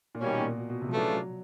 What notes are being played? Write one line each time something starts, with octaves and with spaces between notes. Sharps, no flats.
A#2
B2 D#3 G3 A#3 C#4
B2
A#2
B2
B2
C3
F3
C#3 E3 F#3 A3 D4 F4
F#3